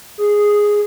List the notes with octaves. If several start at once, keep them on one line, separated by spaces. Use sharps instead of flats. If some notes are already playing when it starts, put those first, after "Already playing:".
G#4